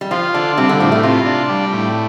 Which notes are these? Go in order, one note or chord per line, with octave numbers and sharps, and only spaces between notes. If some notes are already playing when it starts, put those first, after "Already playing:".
G3
F3 F4
D3 D4
C3 G3
D3
A2 F3
A3
C3 F4
D4
G3
A2